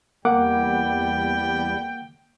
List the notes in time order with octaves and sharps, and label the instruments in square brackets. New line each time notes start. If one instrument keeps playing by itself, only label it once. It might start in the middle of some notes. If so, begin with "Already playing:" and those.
[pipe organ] E2 G3 [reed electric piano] A#3 F#5 D6 [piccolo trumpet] G5